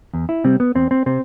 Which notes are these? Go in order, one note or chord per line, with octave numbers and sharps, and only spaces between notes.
E2
E4
C3 G3 C4
B3
E2 C4
C4
C3 C4